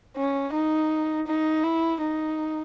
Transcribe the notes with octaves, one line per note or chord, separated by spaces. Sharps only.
C#4
D#4
D#4
E4
D#4